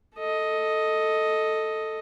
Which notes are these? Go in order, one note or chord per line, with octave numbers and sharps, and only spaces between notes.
A4 D#5